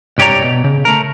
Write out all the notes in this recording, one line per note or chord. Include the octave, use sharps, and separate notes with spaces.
C2 G2 G4 C#5 D5 A#5
B2
C#3
A3 A#4